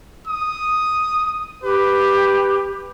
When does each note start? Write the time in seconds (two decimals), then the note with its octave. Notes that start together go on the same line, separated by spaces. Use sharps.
0.28 D#6
1.63 G4 B4